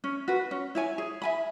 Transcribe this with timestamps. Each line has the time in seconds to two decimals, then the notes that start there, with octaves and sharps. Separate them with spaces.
0.04 C#4
0.28 F#4 B4
0.51 C#4
0.75 E4 C#5 G#5
0.98 G#4
1.22 E5 G#5 B5